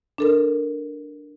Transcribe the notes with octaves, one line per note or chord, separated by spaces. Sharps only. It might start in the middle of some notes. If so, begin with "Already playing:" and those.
D4 A4 A#4